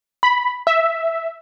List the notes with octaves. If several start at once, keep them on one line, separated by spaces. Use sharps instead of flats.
B5
E5